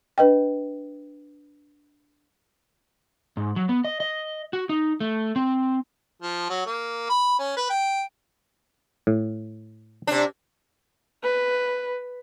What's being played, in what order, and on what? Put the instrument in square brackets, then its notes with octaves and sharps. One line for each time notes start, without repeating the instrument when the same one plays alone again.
[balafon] D4 B4 D#5 G5
[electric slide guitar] G#2
F#3
B3
D#5
D#5
F#4
D#4
A3
C4
[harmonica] F3
F#3
A#3
B5
C#4
B4
G5
[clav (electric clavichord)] A2
[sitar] C3 D4
[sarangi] B4